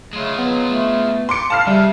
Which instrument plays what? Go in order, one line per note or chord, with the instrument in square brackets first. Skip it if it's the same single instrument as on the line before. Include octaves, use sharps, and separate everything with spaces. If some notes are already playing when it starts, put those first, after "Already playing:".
[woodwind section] C#3 F#3 A3 [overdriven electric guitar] G#3 F4
[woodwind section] F#3 [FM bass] B3
[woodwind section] A3
[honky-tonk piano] C6 D6 C#7
[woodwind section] A4 F5 [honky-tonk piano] A5 F6 C7
[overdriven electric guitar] C#3 [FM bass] G3 [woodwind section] C5 E5